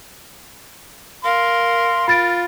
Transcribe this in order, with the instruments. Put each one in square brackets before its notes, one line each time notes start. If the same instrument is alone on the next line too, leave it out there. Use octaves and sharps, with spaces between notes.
[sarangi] A#4 [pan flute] F5 [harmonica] C6
[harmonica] F4 [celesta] B5 A6 D7